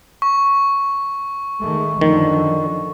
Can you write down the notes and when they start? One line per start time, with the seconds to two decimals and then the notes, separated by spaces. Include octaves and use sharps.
0.22 C#6
1.61 D#3 G#3 A3
2.01 F#2 D3 D#3 F3